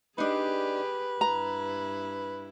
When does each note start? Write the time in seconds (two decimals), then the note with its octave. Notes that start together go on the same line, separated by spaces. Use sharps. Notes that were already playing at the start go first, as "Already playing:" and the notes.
0.18 D4 D#4 G4 G#4 B4
1.21 G2 E4 A#5